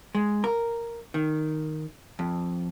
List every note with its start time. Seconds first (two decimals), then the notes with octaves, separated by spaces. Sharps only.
0.15 G#3
0.44 A#4
1.14 D#3
2.19 F2